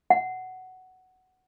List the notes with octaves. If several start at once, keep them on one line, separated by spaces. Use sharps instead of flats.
F#5